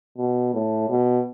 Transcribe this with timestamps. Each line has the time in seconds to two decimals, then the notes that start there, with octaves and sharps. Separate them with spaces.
0.18 B2
0.54 A2
0.90 B2